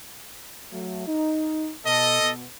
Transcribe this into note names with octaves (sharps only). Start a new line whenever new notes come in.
F#3 A3
D#4
B2 A4 D#5
B2